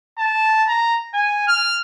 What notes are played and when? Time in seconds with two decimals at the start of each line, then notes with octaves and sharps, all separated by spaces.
0.19 A5
0.68 A#5
1.14 G#5
1.48 F6